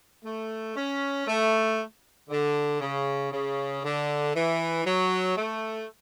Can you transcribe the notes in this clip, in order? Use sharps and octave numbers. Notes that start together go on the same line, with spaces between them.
A3
C#4
A3
D3
C#3
C#3
D3
E3
F#3
A3